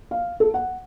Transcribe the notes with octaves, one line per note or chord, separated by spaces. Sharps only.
F5
A4
F#5